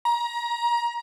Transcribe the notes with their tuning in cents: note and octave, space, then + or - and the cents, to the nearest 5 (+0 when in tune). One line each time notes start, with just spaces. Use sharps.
A#5 +30